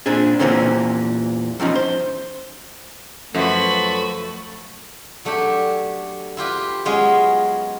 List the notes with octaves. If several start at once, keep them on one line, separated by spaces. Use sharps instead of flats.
A#2 C4 D4 G#4
E2 A#2 E3 A#3 C4 C#4
E2 F3 C#4 D#4
C5
F#2 F3 A3 F#4 B4
F#3 A3 D4 G4
E4 F4 G4 B4
F#3 G#3 B3 C#4 F4